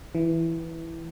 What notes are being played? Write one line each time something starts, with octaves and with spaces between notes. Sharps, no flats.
E3